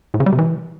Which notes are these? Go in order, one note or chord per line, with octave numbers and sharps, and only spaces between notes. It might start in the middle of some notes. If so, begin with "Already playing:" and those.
A2
C#3
G3
C3
E3